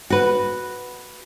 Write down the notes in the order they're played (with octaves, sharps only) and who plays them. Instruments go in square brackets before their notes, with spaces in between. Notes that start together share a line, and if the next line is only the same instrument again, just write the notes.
[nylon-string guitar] F#4 B4